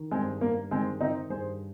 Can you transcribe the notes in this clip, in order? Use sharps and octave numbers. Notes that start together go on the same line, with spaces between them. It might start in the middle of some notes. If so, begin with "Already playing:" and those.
Already playing: D#3
G2 G#3 C4
G2 A#3
D#3 G#3 C4
D#3 C4 D#4
G2 G#4 C5